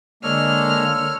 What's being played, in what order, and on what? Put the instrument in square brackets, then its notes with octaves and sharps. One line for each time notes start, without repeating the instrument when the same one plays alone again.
[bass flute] D3 [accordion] G#3 A#3 D4 [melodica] A4 C#5 [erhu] F6